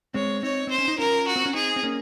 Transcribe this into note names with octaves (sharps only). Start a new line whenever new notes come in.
G#3 C4 C#5
C4 D#4 C#5
C4 C5
C#4
D#4
C#4 F4 A#4
F#4
C4
C#4
C4 D#4 G#4
C4
A#3 C#4